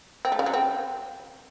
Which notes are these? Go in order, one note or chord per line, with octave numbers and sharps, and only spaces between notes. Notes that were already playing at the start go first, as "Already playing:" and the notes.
C4
A3
C#3
F#3
C4